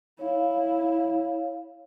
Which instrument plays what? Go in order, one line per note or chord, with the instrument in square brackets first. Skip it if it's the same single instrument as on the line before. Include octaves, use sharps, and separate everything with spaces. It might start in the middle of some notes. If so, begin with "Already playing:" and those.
[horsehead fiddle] E4 [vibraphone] C#5 F5